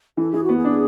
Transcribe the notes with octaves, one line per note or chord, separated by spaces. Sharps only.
E3 A4
E3 G#4
F#4
B3
G#4
D4